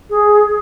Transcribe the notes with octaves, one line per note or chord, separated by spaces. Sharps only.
G#4